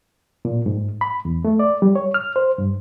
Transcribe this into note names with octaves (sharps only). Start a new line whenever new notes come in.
A#2
G#2
B5
E2
A3
D5
G3
C#5
F6
C5
G2